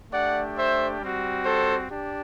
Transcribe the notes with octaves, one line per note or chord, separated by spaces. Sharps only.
A3 D4 G4 D5 F#5
C5 E5
G3 C4 F#4
A4 C5
D4 G4